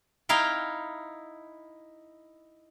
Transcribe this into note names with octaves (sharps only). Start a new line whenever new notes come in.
D#4 E4 F5 G5